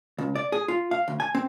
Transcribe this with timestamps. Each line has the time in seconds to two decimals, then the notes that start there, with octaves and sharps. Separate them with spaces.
0.18 C#2
0.36 D5
0.52 G#4
0.68 F4
0.91 F5
1.08 D2
1.20 G#5
1.35 C4